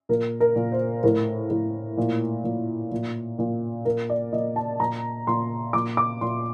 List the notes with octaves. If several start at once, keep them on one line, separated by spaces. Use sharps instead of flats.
A#2 A#4
A#4
A#2
C5
A2 A#4
A2
A#2
A#2
A#2
A#2
A#2 A#4
D5
A#2 D#5
A5
A#2 A#5
A#2 C6
A#2 D6
D6
A#2 C6